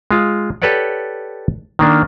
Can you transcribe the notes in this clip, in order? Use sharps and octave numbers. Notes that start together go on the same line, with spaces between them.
G#3 F4
G4 A4 B4 C#5 D5 F#5
D#3 A#3 D4